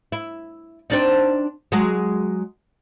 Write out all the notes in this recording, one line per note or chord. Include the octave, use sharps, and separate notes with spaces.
E4
C4 D4 D#4
F#3 G#3